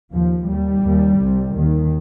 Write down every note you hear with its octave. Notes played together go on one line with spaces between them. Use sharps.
D#2 F3
D#2 G3
D#2
C2 C3
D#2 D#3